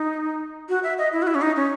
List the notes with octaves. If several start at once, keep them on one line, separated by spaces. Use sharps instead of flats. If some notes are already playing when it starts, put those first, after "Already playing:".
Already playing: D#4
F#4
E5
D#5
E4
F#4
E4
C#4
D#4
C#4